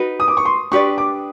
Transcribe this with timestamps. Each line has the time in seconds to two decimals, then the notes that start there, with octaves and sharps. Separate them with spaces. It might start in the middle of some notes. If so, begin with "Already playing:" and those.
Already playing: D#4 F#4 B4
0.20 D#6
0.28 D6
0.37 C#6
0.45 C6
0.72 D4 G4 B4 D5 C#6
0.98 D6